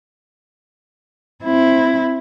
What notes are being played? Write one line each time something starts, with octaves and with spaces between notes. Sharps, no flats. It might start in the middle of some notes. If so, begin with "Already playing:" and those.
C4 E4